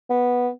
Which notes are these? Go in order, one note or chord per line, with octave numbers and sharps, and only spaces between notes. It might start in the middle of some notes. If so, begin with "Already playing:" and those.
B3